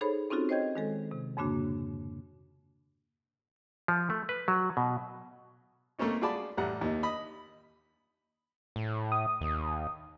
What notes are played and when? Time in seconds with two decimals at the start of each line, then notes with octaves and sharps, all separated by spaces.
0.01 D#4 G#4 A4 C5 C#5 B5
0.30 C4 C#4 D#4 F4 F#4 A4
0.49 C5 C#5 D#5 G5 G6 G#6
0.76 D#3 G#3 A4
1.11 C3
1.37 F2 G#2 C#3 A#3 D4 F#4
3.88 F3
4.10 A3
4.29 B4
4.48 F#3
4.77 B2
5.99 A3 A#3 C4 C#4 D#4
6.21 F4 F#4 G#4 D5 A5 B5
6.57 A1 G3 F#5 A#5
6.81 D#2 D#4
7.03 D#5 B5 D#6
8.76 A2
9.12 D#6
9.41 D#2